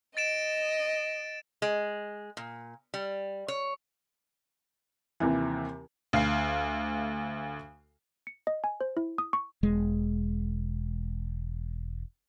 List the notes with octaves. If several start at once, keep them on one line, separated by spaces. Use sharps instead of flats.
D#5 A6 D7 E7
G#3
A#2
G3
C#5
D#2 C3 E3
D2 F5 C7
C#7
D#5
G#5
C5
E4
D#6
C#6
E1 G#3